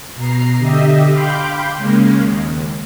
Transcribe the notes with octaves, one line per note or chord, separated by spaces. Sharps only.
B2 A#5 C7
D3 G4 D#5 E5
F5 G5 B5 C6 D6 G6
C#3 G#3 A#3 C#4
D#2